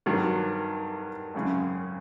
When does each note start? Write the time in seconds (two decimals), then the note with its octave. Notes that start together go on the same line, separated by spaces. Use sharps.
0.06 G2 D#3 F#3
1.34 G#1 F#2 C#3